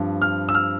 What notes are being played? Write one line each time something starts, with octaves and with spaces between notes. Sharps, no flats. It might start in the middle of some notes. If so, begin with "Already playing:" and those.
Already playing: G2 F3 C4
F6
E6
F6